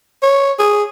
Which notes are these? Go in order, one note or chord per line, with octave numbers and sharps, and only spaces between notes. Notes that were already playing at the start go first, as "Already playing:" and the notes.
C#5
G#4